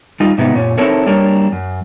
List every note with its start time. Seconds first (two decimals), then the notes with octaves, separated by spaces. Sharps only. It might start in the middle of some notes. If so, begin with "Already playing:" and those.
0.20 G3 D#4 F4
0.38 G#2 C3 B3 D#4 E4
0.54 F#2 A#2 C#4
0.78 C4 D#4 E4 A4 A#4 C#5
1.06 F#3 G3 A#3 D4 A#4 C#5
1.52 F#2